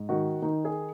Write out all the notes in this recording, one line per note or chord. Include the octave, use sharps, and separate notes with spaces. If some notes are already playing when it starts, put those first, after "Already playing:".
Already playing: G#2
D#3 F#4
D#3 D#4
G#4